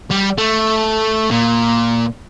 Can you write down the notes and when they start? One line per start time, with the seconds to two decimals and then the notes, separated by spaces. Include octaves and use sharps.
0.11 G3
0.38 A3
1.31 A#2